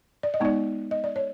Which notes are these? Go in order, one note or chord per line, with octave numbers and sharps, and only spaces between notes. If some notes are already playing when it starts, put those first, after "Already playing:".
D5
D#5
G#3 B3 D#4 D5
D#5
D5
C#5